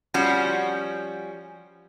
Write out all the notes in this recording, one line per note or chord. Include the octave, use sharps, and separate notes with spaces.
F3 G3 C#4 F#4